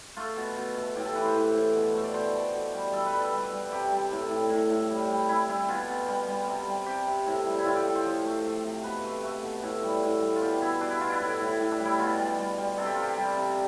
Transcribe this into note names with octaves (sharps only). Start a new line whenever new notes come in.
A3 F4
B2
B2
A3
A2 G4
A4
E3 B4
C5
A2
A2
B2
A3
D5
B2 C5
A3
B2
G3
G3 A4
B4
G3
A4
G3
G3
C3 G4
G3
A2
A2
A2
A2
G3
G3
G3 E4
G3 E4
B2 F4
B2
G3
G3
C3
G3
C3 G4
C3
A2
G3
E4
A2 F4
G4
A2 A4
C5
F3
A3
A3
C3
B2 B4
A3
A3
B2
A2
G3
A2
G3
F4
B2 G4
B2 E4
B2 D4
E4
B2 F4
E4
A2
A2
A2
D4
G3
E4
B2 F4
G3
G3
G3
C3 A4
G4
C3 F4
G4
G3
C3